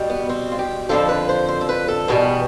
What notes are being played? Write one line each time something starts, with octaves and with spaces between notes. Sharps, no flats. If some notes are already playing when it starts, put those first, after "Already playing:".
Already playing: B2 G3
B3
C4
F4
G4
F2 D3 F3 A4
B4
C5
C5
A4
B4
A4
E2 B2 G3 B3